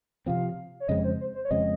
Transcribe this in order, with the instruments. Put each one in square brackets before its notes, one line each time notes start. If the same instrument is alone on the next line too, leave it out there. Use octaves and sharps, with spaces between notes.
[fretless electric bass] C3 F3 C4 [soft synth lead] F5
[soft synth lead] C#5
[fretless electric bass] F2 C#3 G#3 C4 [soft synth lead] D#5
[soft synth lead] C5
C5
C5
C#5
[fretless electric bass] F2 C#3 G#3 C4 [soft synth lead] D#5